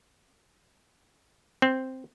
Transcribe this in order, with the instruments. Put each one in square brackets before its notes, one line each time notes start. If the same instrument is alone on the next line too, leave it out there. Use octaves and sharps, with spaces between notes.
[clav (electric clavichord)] C4